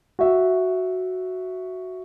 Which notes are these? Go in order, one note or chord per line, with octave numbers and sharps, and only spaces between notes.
F#4 E5